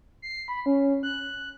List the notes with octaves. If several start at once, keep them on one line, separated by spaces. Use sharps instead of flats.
C7
B5
C#4
F#6